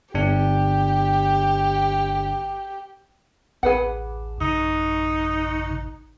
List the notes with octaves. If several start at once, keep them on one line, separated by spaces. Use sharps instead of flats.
G1 D4 G4
A1 D2 G#4 B4 F#5
F#2 C#3 D#4